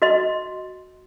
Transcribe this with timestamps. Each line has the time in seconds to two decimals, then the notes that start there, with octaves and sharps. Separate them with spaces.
0.02 F#4 D#5 C6